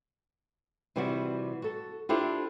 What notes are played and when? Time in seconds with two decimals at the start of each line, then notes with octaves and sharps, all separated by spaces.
0.96 C3 E3 G3 F4 F#4
1.62 F#4 A4
2.09 D4 E4 F4 G4 A4 C5